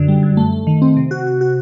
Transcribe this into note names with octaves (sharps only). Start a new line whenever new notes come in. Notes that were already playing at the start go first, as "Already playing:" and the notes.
Already playing: F#2 D3
G3
F#2
A3
A3
D#3
C4
C3
F#4
F#4
F#4